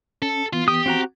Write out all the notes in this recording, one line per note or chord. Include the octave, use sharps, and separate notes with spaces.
C#4 A4
E3 B3 F4
G4 D#6
C4 F#4 A#5